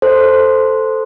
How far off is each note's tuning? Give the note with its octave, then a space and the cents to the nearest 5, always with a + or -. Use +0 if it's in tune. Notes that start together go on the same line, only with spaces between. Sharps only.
A4 +0 C5 +0